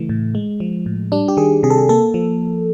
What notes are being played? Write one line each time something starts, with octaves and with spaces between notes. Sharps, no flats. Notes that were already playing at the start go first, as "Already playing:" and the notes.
Already playing: C#3 E3 A3
A2
G#3
F3
A2
G3 D4
G4
D#3 G#4
C3 G#4
A4
G#4
A#3 A4
F3